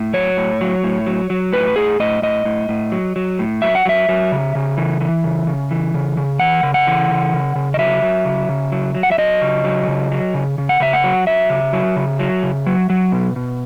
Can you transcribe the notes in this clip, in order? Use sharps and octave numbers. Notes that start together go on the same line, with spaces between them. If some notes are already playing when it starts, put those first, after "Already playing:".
Already playing: A2
F#3 C#5
A2
F#3
A2
F#3
F#3
A2 B4
A2 G#4
A2 D#5
A2 D#5
A2
A2
F#3
F#3
A2
F#3 E5
F#5
F#3 E5
F#3
C#3
C#3
E3
E3
C#3
C#3
E3
C#3
C#3
E3 F#5
C#3
F#5
E3
C#3
C#3
C#3
D#5
F#3 E5
F#3
C#3
C#3
F#3
F#3
F#5
E5
F#3 D#5
C#3
F#3
C#3
F#3
C#3
C#3
F#5
C#3 E5
F#5
F#3
F#3 E5
C#3
F#3
C#3
F#3
C#3
F#3
F#3
B2
B2